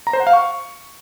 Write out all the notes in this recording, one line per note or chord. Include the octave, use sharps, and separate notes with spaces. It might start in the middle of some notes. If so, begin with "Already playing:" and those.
A#5
C5
F#5
F5
C#6